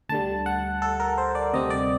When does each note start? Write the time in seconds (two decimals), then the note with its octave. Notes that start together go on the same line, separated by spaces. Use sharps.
0.09 D2 D3 G3 A5
0.46 F#5
0.82 A4
1.00 A#4
1.18 C5
1.35 D5
1.53 D2 C3 G3 C4 D#5
1.70 D5